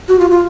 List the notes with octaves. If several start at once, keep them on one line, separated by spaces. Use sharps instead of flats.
F#4
F4
F4